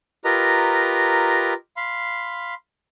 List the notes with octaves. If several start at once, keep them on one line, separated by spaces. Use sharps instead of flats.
F4 G4 A#4 B4 D#5 A#5
F5 B5 C6